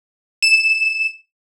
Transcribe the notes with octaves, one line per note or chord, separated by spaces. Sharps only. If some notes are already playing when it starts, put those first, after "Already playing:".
E7